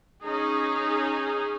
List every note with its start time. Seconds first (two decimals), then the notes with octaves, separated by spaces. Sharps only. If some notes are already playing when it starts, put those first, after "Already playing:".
0.23 C#4 D#4 G#4